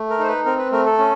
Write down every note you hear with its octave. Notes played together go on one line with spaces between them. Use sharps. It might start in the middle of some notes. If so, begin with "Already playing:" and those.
Already playing: A3
A#4
D#4 C5
B4
C4 A#4
B4
A3 A#4
A4
C#4